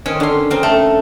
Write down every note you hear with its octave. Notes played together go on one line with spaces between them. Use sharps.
D#3 C4 C#4
D3 C6
C#3 C4 A#4
A3